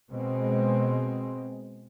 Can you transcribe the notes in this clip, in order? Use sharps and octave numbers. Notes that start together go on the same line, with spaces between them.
B2 G#3 C4